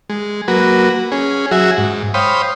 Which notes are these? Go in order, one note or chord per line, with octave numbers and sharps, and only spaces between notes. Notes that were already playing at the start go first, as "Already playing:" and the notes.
G#3
F#3 A#3 F#4 B4
C#4 G#4
F#3 F#4 G#4 E5
G#2
C5 C#5 F5 G5 B5 D#6